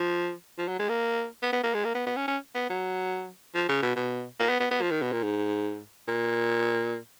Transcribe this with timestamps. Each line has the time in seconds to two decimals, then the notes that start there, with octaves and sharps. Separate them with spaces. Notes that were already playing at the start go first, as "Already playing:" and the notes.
Already playing: F3
0.58 F3
0.68 F#3
0.79 G#3
0.89 A#3
1.42 B3
1.52 B3
1.63 A#3
1.74 G#3
1.84 A#3
1.95 B3
2.06 B3
2.16 C#4
2.27 C#4
2.55 B3
2.70 F#3
3.55 F3
3.68 C#3
3.82 B2
3.96 B2
4.39 A#3
4.49 B3
4.60 B3
4.71 B3
4.81 F3
4.91 D#3
5.02 B2
5.12 A#2
5.23 G#2
6.08 A#2